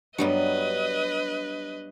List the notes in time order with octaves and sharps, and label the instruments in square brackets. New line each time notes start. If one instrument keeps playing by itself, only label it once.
[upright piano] G2 [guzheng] F#3 G3 B3 [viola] B4 D#5